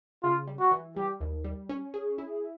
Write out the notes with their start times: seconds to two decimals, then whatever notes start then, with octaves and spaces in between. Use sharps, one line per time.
0.23 C#3 F4
0.47 G3
0.60 F#4
0.71 E3
0.96 G3 G4
1.21 D#2
1.44 G3
1.69 C#4
1.94 G#4
2.18 E4